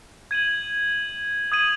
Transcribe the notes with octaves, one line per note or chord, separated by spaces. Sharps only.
G#6 D#7 F#7
D#6 G#6 D#7 F#7